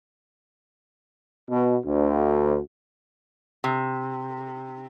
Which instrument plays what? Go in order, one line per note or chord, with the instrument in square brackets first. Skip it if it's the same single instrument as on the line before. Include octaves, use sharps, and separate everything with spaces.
[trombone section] B2
D2
[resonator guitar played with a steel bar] C3